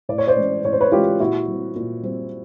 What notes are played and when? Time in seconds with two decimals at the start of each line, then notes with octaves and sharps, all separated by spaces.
0.09 A2 D5
0.18 C#5
0.27 C5 D5
0.36 E3 G#3 C#4
0.65 A2 C#5
0.73 C5
0.81 B4 C#5
0.92 E3 G#3 C#4 F4 G4
1.20 A#2 E4 F#4
1.48 G3 C4
1.76 A#2
2.03 G3 C4